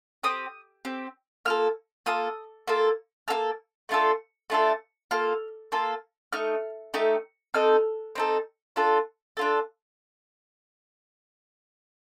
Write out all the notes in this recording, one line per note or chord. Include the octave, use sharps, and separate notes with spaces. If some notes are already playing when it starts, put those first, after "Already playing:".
C4 G4 D#6
C4 G4
A#3 F4 A4 F6
A#3 F4 A4 D#6
A#3 F4 A4
A#3 F4 A4 F6
A3 D4 F4 A4
A3 D4 F4 A4
A#3 F4 A4 F6
A#3 F4 A4
A3 D#4 F6
A3 D#4 G4
C4 D#4 A4 F6
C4 D#4 A4
D4 F4 A4
D4 F4 A4